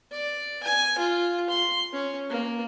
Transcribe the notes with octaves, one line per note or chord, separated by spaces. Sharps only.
D5
G#5
F4
C6
C#4
A#3